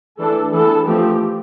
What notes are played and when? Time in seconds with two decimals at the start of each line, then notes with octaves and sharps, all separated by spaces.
0.19 E3 A3 D4 A4
0.53 E3 B3 D4 A4
0.88 F3 A3 C4 G4